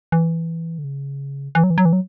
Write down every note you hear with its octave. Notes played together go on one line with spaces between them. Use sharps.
E3
D3
C#3
E3
F#3
E3
F#3
E3
F#3